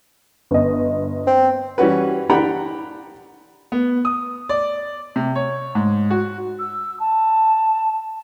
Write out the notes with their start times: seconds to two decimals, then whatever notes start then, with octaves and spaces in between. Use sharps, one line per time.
0.51 G1 D#5
1.27 C4
1.78 E3 G3 C#4 F#4 B4
2.30 D4 G4 F#5 G5 A#5 B5
3.72 B3
4.05 D#6
4.49 D5
5.16 C3
5.36 C#5
5.75 G#2
6.10 F#4
6.59 E6
6.99 A5